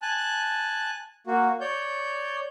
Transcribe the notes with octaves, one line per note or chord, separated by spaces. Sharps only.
G#5 A5 F#6
A#3 F#4
C#5 D5 G6